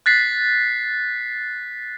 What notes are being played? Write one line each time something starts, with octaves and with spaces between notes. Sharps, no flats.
F#6 A6 B6 C7